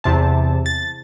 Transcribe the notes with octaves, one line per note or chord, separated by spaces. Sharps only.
E2 C3 A5
A6